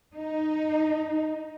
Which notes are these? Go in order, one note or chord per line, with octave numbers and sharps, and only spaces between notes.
D#4